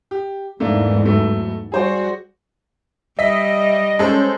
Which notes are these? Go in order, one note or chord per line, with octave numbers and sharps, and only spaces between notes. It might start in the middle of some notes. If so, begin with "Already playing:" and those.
G4
E2 G#2 E3 A3 A#3 D4
F#3 A3 A4
G3 F#4 G#4 C5 D5
G3 D#5 E5 B6
G#3 C#4 A4 C5